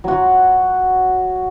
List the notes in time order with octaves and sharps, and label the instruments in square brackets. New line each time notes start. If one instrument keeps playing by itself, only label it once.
[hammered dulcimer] F#3 F#4